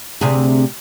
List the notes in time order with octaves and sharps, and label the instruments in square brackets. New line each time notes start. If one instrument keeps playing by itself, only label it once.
[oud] D2 C3 G#4